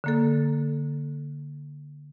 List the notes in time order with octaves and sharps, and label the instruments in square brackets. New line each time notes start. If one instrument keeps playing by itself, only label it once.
[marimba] D3 A#3 A4